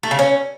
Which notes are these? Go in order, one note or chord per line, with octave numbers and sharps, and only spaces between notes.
A3
C#3
C#4